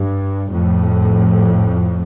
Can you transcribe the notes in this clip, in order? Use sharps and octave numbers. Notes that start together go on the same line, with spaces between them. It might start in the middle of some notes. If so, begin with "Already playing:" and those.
Already playing: G2
F2 A2